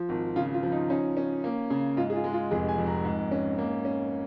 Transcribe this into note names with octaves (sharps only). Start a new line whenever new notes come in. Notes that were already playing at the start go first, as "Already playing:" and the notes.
Already playing: F3
G#1
C#3 F4
F4
F3
D#4
C#4 D#4
C#4
A#3
C#3
G#2 F4
G#4
F4
G#3
F4
F1 G#4
G#5
F2
A#5
G#2
C#4
A#3
C#4